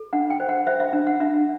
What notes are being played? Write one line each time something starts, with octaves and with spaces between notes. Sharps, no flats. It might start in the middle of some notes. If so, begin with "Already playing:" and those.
Already playing: A4
D4 F#5
G5
C5
F#5
C5 E5
E5
D4
F#5
D4 E5